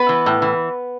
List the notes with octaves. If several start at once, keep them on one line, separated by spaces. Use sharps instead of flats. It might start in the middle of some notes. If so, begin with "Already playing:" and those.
Already playing: B3 B4
E3
A2
E3